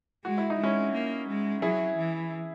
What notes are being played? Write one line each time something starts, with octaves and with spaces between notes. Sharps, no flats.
G#3 F#4
E4
D#4
G#3 C#4 E4
A#3
G#3
F#3 E4 G#4
E3